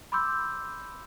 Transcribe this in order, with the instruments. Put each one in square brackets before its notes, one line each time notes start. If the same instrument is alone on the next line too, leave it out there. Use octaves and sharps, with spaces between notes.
[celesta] B5 C6 D6 E6 G6